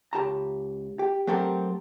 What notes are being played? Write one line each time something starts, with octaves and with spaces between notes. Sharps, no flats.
C#2 G4 A5 A#5
G4
F#3 A3 C4 G4 A4 A#4